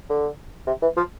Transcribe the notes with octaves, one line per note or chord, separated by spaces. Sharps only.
D3
C3
E3
F3